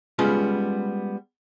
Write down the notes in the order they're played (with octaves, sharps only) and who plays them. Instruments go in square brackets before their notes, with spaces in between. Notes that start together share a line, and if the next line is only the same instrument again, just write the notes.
[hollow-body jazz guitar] G3 G#3 B3 C#4 F4